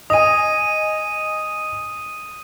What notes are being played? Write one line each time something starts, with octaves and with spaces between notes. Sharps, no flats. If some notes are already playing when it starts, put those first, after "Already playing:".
D#5 G#5 D#6 D#7